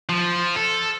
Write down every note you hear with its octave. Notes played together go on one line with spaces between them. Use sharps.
F3
A4